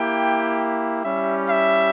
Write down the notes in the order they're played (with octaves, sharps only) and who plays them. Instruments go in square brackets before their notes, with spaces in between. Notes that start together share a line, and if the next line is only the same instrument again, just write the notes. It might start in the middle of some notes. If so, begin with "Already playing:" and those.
Already playing: [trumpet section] A#3 E4 G4 G5
G3 C#4 E4 G4 E5
E5